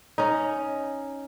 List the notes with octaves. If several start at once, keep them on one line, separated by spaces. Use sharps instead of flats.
C#4 D#4